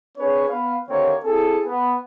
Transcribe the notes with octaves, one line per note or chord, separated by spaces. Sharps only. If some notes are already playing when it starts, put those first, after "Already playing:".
C4 D4 G#4 B4 C#5
B3 B4 F5
D#2 D3 A#3 C4 C#5
C4 E4 G#4 A4
B3